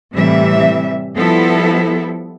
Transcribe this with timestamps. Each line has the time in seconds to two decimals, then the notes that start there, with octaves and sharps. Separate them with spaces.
0.14 A2 C3 E3 G3 E5
1.16 F3 G3 B3 E4 A4